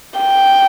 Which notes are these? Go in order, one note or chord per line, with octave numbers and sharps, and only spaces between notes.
G5